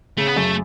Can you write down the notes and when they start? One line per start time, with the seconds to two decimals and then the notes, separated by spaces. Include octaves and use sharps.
0.17 C#3 A3
0.27 B3
0.36 F#2 A3